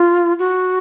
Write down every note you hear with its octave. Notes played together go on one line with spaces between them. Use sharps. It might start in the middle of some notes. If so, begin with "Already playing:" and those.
Already playing: F4
F#4